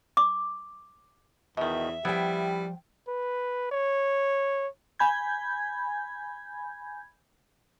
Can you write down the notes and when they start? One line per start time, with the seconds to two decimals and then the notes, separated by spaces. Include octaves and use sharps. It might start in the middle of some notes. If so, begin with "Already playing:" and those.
0.17 D6
1.57 E2 B2 D#3 E5
2.05 F3 G3 B3 E4 G5
3.08 B4
3.72 C#5
4.99 G#5 B5 G6 G#6